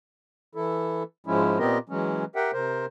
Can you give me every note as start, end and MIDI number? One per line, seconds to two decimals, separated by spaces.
0.55 1.03 52
0.55 1.03 64
0.55 1.03 69
1.26 1.59 44
1.26 1.59 53
1.26 1.59 56
1.26 1.59 61
1.26 1.59 64
1.59 1.78 46
1.59 1.78 59
1.59 1.78 60
1.59 1.78 67
1.59 1.78 70
1.59 1.78 75
1.89 2.24 52
1.89 2.24 54
1.89 2.24 56
1.89 2.24 61
2.36 2.51 67
2.36 2.51 70
2.36 2.51 76
2.36 2.51 78
2.36 2.51 79
2.53 2.86 48
2.53 2.86 70
2.53 2.86 72